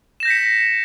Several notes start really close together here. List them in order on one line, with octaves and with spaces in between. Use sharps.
E7 A#6 G6 B6 C#7